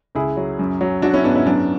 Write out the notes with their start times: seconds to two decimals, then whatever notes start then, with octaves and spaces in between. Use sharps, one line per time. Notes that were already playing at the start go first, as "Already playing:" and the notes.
0.15 C#2 E4 G#4
0.37 F#3
0.59 F#2
0.81 F#3
1.02 F#3 D4 F#4
1.14 C#4 E4
1.24 G#2 B3 D4
1.36 C#4 E4
1.46 F#2 B3 D4